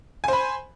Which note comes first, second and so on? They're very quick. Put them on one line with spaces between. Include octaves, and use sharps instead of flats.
G#5 C5 B5